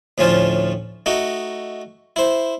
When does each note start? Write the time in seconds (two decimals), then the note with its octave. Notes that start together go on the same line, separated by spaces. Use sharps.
0.18 D2 A2 F3 C#4 F4 A5
1.06 A3 D#4 F#4
2.16 E4 C5